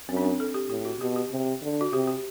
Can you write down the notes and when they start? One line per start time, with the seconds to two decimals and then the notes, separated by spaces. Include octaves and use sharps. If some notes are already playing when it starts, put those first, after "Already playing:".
0.09 F#2 C4
0.17 D4
0.24 C4
0.40 A4
0.54 G4
0.70 A2 G4
0.85 F#4
1.00 B2 G4
1.16 G4
1.31 C3
1.62 D3
1.81 F#4
1.93 C3 G4
2.07 G4